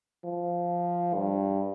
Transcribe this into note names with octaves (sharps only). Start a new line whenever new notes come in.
F3
G2